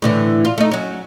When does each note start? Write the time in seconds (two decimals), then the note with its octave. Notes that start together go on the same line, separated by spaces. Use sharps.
0.02 A2 D3 E3
0.45 F4
0.58 A3 D#4
0.71 F#3 C#4